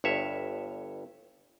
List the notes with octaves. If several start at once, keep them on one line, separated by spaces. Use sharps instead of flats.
G1 G2 C#5 E5